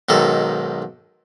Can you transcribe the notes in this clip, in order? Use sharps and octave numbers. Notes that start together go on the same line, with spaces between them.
B1 G#2 D#3 A4